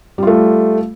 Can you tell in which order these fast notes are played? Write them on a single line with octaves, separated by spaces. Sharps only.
G3 F4 A3